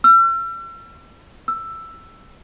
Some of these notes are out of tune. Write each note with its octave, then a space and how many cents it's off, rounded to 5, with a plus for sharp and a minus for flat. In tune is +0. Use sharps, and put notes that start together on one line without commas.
E6 +40
E6 +10